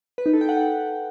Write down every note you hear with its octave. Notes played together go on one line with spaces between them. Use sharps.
B4
D#4
A4
G5
F#5